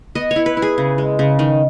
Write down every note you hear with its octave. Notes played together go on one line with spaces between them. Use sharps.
B3 D#5
C#5
E4
B4
E4
G#4
C#3
G#3
C#3
D#3